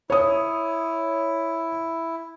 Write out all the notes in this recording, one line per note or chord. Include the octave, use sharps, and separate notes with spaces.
E4 C#5 D#6